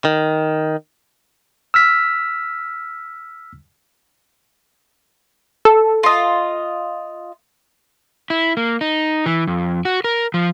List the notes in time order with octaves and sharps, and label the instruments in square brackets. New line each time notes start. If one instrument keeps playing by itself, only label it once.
[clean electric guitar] D#3
[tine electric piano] E6 F6 B6
[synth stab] A4
[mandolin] F4 D#5
[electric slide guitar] E4
A#3
D#4
E3
F2
F#4
A#4
F3